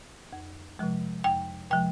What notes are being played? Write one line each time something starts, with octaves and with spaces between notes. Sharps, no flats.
F2
C3 F3 G#3
F2 G5
C3 F3 G#3 G5